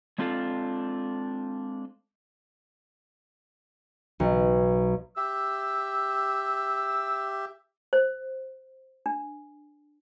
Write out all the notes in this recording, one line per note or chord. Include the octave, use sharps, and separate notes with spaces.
G#3 C4 D4 F4 A4 F5
B1
G4 E5 E6
C5
D4